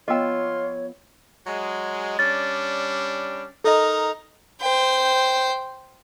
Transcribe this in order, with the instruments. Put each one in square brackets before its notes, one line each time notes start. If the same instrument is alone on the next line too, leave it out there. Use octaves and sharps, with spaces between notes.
[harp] F3 B3 E6 [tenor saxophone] F4 [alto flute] C#5 [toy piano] D#5 G5
[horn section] F#3 G#3
[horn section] G3 C#4 D4 [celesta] A6
[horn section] D#4 A#4 A#5 [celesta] A4 D#5
[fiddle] C5 G5